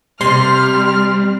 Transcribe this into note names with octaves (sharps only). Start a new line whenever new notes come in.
C3 G3 C6 F6